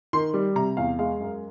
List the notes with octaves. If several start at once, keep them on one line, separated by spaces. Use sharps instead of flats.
D#3 C6
G3
C3 A#5
E2 F5
G#3 F5
F#2